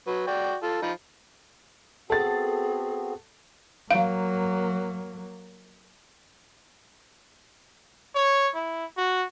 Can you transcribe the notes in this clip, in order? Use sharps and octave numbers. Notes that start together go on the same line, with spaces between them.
F#3 B4
F#4 D5 G5
F4 A4
F3 D#4 B5
B3 C4 F#4 G#4 A4 A6
F#3 A#3 F5
C#5
E4
F#4